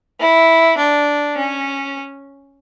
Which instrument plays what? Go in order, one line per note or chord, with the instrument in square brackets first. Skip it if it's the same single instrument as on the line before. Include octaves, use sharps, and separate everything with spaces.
[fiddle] E4
D4
C#4